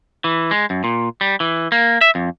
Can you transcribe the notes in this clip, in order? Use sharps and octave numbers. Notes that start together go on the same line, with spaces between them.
E3
G#3
F#2
A#2
G3
E3
A#3
E5
F2